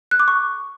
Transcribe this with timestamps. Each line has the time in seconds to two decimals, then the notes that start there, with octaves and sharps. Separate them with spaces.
0.11 F#6
0.20 D6
0.28 C#6